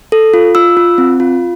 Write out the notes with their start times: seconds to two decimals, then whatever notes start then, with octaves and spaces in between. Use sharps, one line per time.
0.12 A4
0.34 F4
0.55 F4 E6
0.77 F4
0.98 C4
1.20 F4